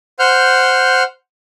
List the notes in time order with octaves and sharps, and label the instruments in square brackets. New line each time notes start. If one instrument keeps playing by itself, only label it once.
[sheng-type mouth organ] C5 F#5 F6 G6